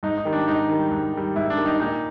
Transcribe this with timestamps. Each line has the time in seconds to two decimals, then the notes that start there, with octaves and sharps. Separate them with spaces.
0.03 G#2 D#4
0.18 D#4
0.25 D#3 G3
0.33 D4
0.47 G#2 D#4
0.69 D#3 G3
0.91 G#2
1.13 D#3 G3
1.36 G#2 E4
1.50 D4
1.57 D#3 G3
1.66 D#4
1.80 A#2 D#4